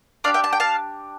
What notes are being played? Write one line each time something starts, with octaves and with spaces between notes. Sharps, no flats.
D4 G4 D5 F5
E5 G5
A5
G5
F5 A5